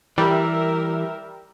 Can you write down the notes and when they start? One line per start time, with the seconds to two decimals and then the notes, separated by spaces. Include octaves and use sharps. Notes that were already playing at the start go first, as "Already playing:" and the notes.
0.18 E3 G3 G4 A#4 E5